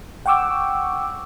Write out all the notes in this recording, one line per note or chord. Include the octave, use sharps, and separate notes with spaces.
F#5 G5 C#6 D6 E6